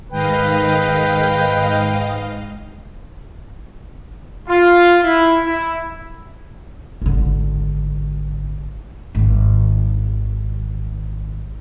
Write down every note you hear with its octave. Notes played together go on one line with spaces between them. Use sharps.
G#2 D#3 B4 D#5 F5 G5
F4
E4
E4
G#1 D3
G#1 D#3